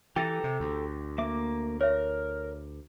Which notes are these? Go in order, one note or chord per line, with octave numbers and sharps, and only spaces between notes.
E3 G4 A4 G5 A#5 A6
C3
D2
A#3 E5 D6
A#4 C#5 E5